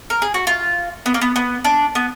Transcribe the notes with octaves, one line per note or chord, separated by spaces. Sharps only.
A#4
G#4
F#4
F4
B3
A#3
B3
B3
D4
B3